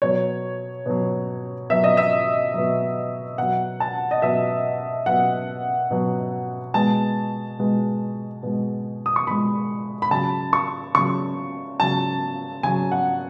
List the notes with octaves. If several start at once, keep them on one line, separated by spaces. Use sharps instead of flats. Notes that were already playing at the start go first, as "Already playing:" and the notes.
B2 F#3 C#5
B2 F#3
B2 F#3 E5
D#5
E5
B2 F#3
B2 F#3 F#5
A5
D#5
B2 F#3 E5
B2 F#3 F#5
B2 F#3
B2 G#3 A5
B2 G#3
B2 G#3
D#6
C#6
B2 G#3 B5
B5
C#3 F#3 A5
C#6
C#3 F#3 C#6
C#3 F#3 A5
C#3 F#3 G#5
F#5